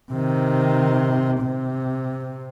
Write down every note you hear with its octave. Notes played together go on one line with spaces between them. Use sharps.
C3 D#3
C3